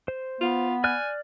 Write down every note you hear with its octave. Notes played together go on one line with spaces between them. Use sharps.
C5
B3 F4
D5 G#5 F6 F#6